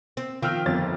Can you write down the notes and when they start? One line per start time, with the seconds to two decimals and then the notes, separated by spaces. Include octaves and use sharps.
0.17 C4
0.42 D#3 F3 F4 G5 E6 F6
0.66 G1 F2 A6